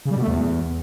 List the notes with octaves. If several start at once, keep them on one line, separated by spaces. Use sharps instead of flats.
C#3
G3
B2
A3
E2